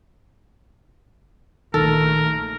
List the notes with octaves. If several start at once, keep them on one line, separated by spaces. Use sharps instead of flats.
A#1 D#3 A3 A4 A#4